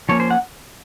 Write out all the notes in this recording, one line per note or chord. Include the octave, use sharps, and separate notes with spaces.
F3 A#3 C#4 C#5
C5
F#5